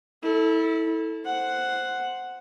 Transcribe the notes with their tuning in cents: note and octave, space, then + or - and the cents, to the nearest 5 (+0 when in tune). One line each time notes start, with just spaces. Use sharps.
E4 -25 A4 +5
C5 +0 F#5 +0